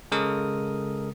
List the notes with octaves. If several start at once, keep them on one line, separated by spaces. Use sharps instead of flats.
C#3 G#3 A4 A#4 D#6